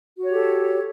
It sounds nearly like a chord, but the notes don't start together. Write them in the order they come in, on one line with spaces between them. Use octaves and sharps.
F#4 C#5 G4 A4